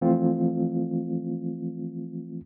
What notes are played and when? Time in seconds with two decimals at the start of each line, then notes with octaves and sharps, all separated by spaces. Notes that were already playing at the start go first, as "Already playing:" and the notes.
0.01 E3 F3 A3 C4 F4